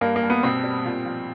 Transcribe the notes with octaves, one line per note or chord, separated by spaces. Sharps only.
G2 A#3
A#3
G2
B3
B2 C4
G3
A#2
F3